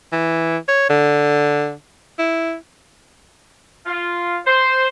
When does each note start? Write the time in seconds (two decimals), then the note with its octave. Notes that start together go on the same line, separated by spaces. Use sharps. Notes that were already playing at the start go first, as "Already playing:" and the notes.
0.12 E3
0.68 C#5
0.89 D3
2.19 E4
3.86 F4
4.46 C5